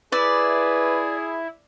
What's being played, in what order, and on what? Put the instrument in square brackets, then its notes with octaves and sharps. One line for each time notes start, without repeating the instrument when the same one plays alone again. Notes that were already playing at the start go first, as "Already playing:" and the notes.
[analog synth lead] E4 [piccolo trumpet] G#4 [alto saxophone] B4 [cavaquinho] D5